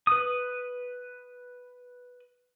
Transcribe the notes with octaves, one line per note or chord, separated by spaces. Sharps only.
B4 D#6